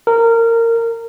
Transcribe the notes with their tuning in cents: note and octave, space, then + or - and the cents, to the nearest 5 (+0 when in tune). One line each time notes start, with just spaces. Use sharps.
A#4 -20